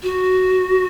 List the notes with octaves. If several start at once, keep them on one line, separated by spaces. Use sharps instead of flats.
F#4